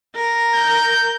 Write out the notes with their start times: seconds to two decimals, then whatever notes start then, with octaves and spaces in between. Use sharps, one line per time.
0.16 A#4
0.55 G6